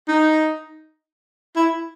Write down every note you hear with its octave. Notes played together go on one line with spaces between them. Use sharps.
D#4
E4